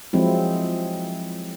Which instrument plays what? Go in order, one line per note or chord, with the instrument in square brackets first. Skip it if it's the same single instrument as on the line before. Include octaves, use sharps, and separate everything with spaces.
[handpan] F3 F#3 G#3 C4 E4